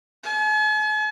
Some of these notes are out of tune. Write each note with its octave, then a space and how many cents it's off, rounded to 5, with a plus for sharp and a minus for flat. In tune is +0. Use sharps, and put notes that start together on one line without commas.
G#5 +45